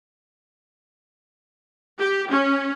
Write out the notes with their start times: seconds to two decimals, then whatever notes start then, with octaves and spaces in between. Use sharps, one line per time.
2.00 G4
2.30 C#4